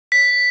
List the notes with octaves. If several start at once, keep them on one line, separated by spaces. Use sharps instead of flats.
B6